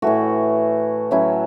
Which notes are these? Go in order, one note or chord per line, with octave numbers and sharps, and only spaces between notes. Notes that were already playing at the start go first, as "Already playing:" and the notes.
A2 E3 A3 F#4
A2 F#3 C#4 E4